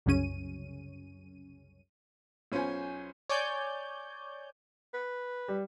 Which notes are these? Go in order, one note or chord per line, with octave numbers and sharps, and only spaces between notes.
C2 F#2 C#3 C#4 D#7
B1 C#4 F4 C5 G#5
C#5 D5 G#5 G6
B4
G3